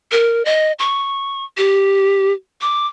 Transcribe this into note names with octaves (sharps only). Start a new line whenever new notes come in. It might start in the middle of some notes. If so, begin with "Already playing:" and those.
A#4
D#5
C#6
G4
D6